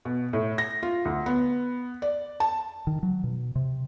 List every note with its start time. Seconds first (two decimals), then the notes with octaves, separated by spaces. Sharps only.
0.05 B2
0.33 A2
0.58 A#6
0.83 F4
1.05 D2
1.26 B3
2.02 D5
2.40 A5
2.87 D#3
3.03 F#3
3.24 B2
3.55 C3